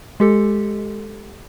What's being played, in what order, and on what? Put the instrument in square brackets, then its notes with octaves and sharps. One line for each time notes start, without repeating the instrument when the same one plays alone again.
[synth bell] G#3 G4 A4